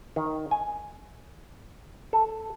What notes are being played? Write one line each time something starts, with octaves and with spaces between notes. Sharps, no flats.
D#3
G#5
A4